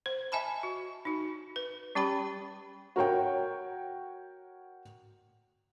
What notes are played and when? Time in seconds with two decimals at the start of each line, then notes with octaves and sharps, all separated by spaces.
0.06 C5
0.32 D#5 E5 G#5 A5 B5
0.63 F#4
1.05 D#4 F#4
1.56 B4
1.95 G3 C#4 G4 G5 B5
2.96 F#4 A#4 C#5 G5